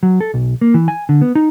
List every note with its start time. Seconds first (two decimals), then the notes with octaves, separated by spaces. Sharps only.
0.03 F#3
0.21 A4
0.34 B1
0.61 A#3
0.74 E3
0.88 G#5
1.09 D3
1.22 B3
1.35 D#4